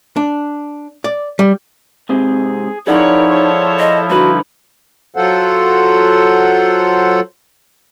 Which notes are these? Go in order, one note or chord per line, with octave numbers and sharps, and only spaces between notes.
D4
D5
G3
G#2 C3 C4 G#4
F3 D#4 E4 G#4 A#4 C#5 D5 F#5
A4 C5 C#5
D#5
G2 D3 D#4 F#4 B4
F#3 F4 A4 C5 F#5